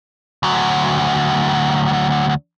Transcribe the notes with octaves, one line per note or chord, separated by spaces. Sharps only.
D2 F#3